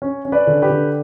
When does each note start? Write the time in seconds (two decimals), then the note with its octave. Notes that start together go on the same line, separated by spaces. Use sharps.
0.02 C#4
0.25 C#4
0.32 B4 D5
0.47 D3
0.62 G4 B4
0.70 D3